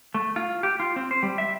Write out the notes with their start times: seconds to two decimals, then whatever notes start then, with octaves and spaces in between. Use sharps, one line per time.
0.14 A3
0.36 F4
0.63 G4
0.80 F4
0.96 C4
1.11 C5
1.23 G3
1.38 E5